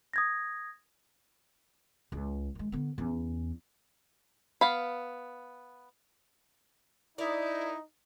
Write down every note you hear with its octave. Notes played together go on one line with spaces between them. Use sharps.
D#6 G#6 A#6
C#2
D#3 G#3
D3 B3
E2 C#4
B3 F5 B5
D#4 E4 A#4 D5